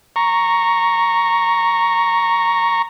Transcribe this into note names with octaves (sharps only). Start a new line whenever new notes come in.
A#5 C#6